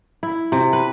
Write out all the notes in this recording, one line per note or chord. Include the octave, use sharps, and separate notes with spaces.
E4
C3
B4